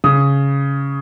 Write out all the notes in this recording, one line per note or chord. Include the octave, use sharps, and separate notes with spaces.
C#3 D#6